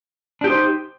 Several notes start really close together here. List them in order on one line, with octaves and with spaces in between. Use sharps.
D4 G4 D#4 C5